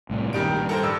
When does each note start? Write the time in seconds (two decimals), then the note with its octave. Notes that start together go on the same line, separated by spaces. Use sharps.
0.10 C2 A2 C4
0.33 G2 A#2 D#3 G3 D7
0.53 G2
0.69 A4 A#4 C5
0.83 G2 E6